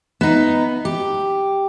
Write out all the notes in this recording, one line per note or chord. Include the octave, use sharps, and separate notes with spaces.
B3 D#4
G4